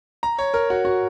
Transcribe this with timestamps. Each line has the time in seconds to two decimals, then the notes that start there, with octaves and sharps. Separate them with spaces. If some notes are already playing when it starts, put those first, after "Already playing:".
0.23 A#5
0.38 C#5
0.54 A#4
0.70 F#4
0.85 F#4